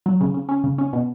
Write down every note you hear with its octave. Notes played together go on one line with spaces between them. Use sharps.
F#3
C#3
C#3
C#4
C#3
C#4
B2